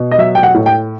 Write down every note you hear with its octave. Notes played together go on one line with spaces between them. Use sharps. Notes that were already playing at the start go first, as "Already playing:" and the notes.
Already playing: B2
D#5
F#3 E5
G5
F#5
A2
G5